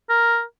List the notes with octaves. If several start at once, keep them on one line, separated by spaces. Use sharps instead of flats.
A#4